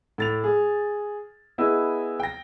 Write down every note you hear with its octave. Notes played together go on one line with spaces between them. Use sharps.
A2 A6 F7
G#4
B3 E4 G#4 D#5
G5 A#6